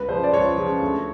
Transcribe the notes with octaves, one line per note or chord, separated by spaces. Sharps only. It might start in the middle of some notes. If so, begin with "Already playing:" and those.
Already playing: C#2 B4
C#3 F3 C5
D5
C#2 C#5
C#3 F3
D2